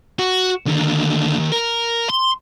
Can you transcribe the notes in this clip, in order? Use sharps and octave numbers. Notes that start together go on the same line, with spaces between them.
F#4
D#2 D3
D#2 D#3
A#4
C6